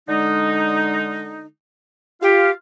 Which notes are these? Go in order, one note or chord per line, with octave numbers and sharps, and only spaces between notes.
D3 G#3 D#4
F4 G4 F5